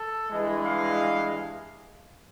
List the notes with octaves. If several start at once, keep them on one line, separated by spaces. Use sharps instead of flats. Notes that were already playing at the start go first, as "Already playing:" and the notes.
Already playing: A4
G2 E3 G#3
F5